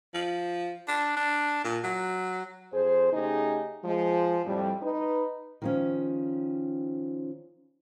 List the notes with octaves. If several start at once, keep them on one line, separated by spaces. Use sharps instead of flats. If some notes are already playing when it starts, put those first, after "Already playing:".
F3
D4
D4
A#2
F#3
F2 G#4 C5
C#3 A3 D#4 G4 G#4
F3 G#3
F2 A2 G3
D#4 B4
D#3 F3 C#4